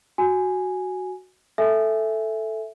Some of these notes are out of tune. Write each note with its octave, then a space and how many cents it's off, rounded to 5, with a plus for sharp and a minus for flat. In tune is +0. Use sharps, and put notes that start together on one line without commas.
F#4 +0 G#5 +0
A4 +0 E5 +0 G#5 +0